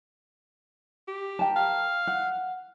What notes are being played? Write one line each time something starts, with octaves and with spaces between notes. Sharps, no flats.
G4
A#4 G5 A5
F5
F#5